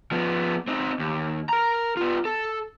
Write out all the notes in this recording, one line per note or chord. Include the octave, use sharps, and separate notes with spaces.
F3 B3
C4 D#4
D#2
A#4 A#5
B3 F4
A4